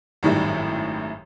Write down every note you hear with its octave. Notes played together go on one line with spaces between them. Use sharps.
G#1 F#2 A2 D#3 G3